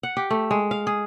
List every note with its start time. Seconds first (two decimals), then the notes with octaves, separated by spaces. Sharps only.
0.03 F#5
0.17 G4
0.30 A3
0.51 G#3
0.71 F5
0.87 G#4